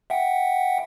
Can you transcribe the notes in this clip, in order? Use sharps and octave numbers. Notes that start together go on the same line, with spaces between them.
E5 F#5 G5